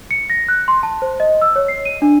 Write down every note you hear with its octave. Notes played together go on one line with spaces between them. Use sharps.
C#7
A#6
F#6
C6
A5
C5
D#5
E6
C#5
C7
D#7
D4